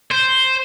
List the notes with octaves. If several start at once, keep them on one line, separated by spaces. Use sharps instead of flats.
C5